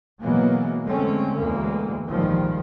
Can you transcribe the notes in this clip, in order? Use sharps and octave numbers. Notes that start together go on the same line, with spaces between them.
B2 E3 F#3 G#3 A#3 B3
D3 G#3 A3 C4 C#4
D2 B2 E3 G#3 A#3
A#1 G#2 D#3 F3 G3